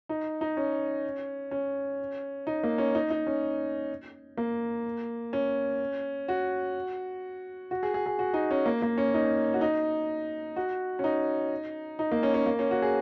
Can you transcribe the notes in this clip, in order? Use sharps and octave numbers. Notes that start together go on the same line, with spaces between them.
D#4
D#4
C#4
C#4
D#4
A#3
C#4
D#4
D#4
C#4
A#3
C#4
F#4
F#4
G#4
G#4
G#4
F#4
D#4
C#4
A#3
A#3
C#4
D#4
F#4
D#4
F#4
C#4
D#4
D#4
A#3
C#4
C#4
A#3
C#4
F#4
G#4